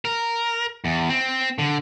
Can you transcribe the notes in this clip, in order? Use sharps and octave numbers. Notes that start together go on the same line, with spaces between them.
A#4
E2
C4
D3